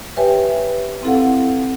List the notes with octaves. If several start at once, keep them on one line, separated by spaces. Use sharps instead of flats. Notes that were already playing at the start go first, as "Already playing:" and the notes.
G4 B4 C#5 E5 G5 G#5
C4 E4 A4 F5 F#5